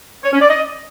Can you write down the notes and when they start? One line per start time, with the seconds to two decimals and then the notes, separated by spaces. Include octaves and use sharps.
0.24 C#5
0.32 C#4
0.41 D5
0.50 D#5